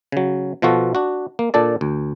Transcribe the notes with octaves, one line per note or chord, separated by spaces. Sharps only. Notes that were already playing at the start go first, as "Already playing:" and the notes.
C#3 F#3
B2 F3 F4 F#4 A4
D4 F#4
A#3
A#2 D4 A4 D5
D2